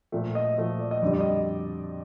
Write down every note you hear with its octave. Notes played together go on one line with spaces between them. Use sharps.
A#2 F3 A3
D#5
A#2 F3 A3
D5
D#5
F2 D3 G3 D5
D5
D#5